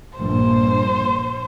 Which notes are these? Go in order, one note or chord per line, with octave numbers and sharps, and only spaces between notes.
A#1 G2 C5